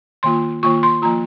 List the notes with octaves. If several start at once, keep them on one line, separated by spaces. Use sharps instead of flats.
D#3 A#3 F4 C6
D#3 A#3 F4 C#6
C6
F3 A#3 F4 A#5